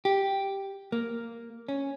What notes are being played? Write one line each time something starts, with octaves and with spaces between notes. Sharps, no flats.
G4
A#3
C#4